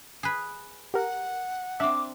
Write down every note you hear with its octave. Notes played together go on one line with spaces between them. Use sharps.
G#4 B4
G4 A#4 F#5
C4 D4 E5 D6